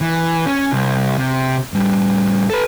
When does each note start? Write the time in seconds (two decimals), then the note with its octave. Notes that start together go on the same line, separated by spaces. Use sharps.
0.01 E3
0.46 C#4
0.72 C2
1.17 C3
1.74 A2 G3
2.50 A4 B4